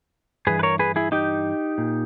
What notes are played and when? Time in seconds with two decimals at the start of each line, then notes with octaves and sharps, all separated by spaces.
0.47 G2 E3 G#4 B4
0.59 B4
0.63 A#4 C#5
0.79 G#4 B4
0.96 E4 G#4
1.12 D#4 G4
1.78 A#2